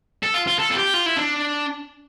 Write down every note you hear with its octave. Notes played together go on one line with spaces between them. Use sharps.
A4
F4
F4
A4
F4
G4
F4
E4
D4